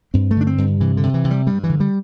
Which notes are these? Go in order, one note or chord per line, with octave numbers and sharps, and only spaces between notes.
G2 C4
A3
D3 D4
C4
G2
C3 E3
D3
C3
E3
C3
G3
G2 G3
E3
D3
G3